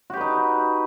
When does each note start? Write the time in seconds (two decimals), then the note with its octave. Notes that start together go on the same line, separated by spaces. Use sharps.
0.10 F#4
0.13 G4
0.17 B4
0.21 D#4